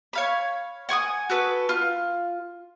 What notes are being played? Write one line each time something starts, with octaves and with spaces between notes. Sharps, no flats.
C#5 F5 B5
F#5 G#5 C#6 D#6
F#4 A4 B4
F4